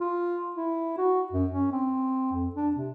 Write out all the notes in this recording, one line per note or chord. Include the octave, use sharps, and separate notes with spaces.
F4
E4
F#4
F#2
C#4
C4
F2
D4
C3